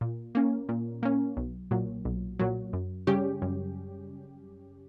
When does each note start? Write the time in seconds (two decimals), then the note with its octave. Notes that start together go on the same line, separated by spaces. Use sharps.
0.01 A#2
0.35 A#3 C#4
0.69 A#2
1.03 A#3 C#4
1.37 B1
1.71 A#2 F#3
2.05 B1
2.39 A#2 F#3
2.73 F#2
3.07 C#3 G3 C#4 G4
3.42 F#2